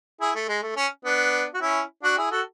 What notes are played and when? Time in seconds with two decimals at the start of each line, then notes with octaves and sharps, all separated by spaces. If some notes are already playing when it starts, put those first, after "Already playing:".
0.21 E4 G#4
0.35 A3
0.48 G#3
0.62 A3
0.76 C#4
1.05 B3 D4
1.54 F#4
1.61 C#4 E4
2.03 D4 F#4
2.18 E4 G#4
2.31 F#4 A4